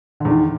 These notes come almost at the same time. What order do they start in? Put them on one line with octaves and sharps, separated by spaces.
D3 E2 D#3